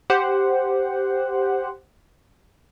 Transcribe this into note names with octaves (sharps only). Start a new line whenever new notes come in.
G4 C5 F#5